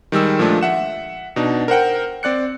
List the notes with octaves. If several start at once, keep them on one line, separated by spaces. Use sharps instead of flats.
D#3 G3 G#3 E6
A#2 F3 G#3 A3 D4
E5 F#5 E7
B2 D4 D#4
A#4 C5 F#5 G5
C4 D5 F#6 C#7